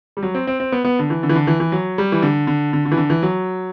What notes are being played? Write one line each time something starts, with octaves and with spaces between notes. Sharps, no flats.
G3
F#3
C4
C4
C4
B3
B3
D3
E3
D3
E3
D3
E3
E3
F#3
G3
E3
D3
D3
D3
D3
E3
D3
E3
F#3